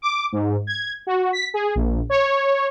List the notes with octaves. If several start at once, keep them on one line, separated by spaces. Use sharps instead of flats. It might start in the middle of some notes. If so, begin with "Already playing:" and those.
D6
G#2
G#6
F#4
B6
G#4
A#1
C#5